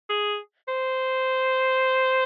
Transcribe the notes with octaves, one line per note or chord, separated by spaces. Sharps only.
G#4
C5